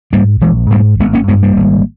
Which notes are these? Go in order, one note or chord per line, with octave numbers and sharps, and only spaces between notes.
G#2 G3 A#3
A#1 E3 G#3
G#2 G3 A#3
G#1 G#3 B3
A#3 C#4
G2 G#3 B3
G3 A#3
G#1